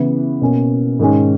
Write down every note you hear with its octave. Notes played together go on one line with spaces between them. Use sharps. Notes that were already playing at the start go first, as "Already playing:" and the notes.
Already playing: C#3 E3 B3 E4 B4
B2 A#3 C#4
G#2 D#3 G#3 C#4